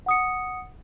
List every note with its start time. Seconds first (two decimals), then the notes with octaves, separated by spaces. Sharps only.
0.06 F#5 D#6 C#7